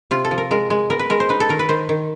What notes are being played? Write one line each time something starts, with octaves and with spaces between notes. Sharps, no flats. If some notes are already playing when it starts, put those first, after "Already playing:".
C3 F4
A4
F3
A#4
G#3 A#4
G#3
B3 A#4
B4
G#3 A#4
C5
D#4 B4
A4
D#3 A#4
B4
D#3 C5
D#3